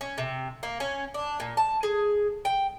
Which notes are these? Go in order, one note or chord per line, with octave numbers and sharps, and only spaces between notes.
C#4
C3
A#3
C#4
D4
A#2
A5
G#4
G5